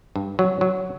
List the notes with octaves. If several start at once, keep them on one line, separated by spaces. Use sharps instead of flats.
G2
F#3
F#3